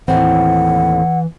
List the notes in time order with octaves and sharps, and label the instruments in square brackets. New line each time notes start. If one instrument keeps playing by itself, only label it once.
[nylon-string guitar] D#2 A2 C4 [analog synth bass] E3 [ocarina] F#5